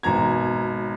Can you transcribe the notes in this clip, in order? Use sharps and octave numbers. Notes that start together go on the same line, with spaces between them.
G#1 B2 A#5 G#6